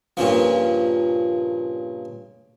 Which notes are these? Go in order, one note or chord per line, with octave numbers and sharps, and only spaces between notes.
G2 A#2 C#3 F3